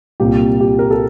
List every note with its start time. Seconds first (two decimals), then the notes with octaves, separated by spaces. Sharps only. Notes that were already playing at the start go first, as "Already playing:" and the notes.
0.20 C2 A#2 G3 G4
0.60 G4
0.79 A#4
0.91 A4